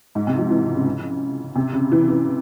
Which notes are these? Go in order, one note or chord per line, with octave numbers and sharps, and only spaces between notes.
G#2
C3
F3
E3
C#3
C3
C#3
E3
E3